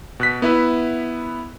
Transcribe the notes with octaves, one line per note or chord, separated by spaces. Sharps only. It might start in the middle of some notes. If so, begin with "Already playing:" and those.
B2 F#6 B6
B3 E4 B4 E5